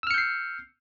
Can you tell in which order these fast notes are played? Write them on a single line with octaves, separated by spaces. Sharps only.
E6 F6 C#7 G6 C7